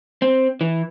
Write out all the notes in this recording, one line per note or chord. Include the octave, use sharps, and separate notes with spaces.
C4
E3